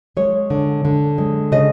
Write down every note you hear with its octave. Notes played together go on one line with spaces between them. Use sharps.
G#3 C#5
D3
D3
G#3
C#3 D#5